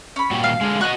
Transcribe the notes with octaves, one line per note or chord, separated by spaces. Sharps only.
C#4 B5
A#2 G3 F#4
F5
D3 G#3
F#4 D5 D#5 C#6 F#6